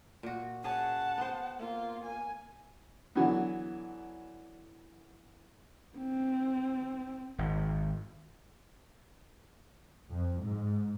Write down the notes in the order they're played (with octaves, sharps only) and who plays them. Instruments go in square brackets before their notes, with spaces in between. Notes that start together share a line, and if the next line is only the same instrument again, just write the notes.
[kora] A#2 F#4
[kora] C#4 G#4 [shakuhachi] F#5 [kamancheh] A5
[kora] B3 C5
[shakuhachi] A#3 [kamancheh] F4
[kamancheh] G#5
[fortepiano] D3 E3 F#3 B3
[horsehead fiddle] C4
[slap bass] G#1
[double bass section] F2
G#2